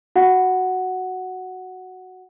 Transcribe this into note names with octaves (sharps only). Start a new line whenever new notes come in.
F#4 F#5